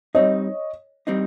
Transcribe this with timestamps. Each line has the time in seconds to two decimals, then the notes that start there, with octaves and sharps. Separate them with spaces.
0.15 G3 C4 D#4 C#5 D#5
1.07 G3 C4 D#4